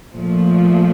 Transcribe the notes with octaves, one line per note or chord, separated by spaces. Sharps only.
A#2 F3 A3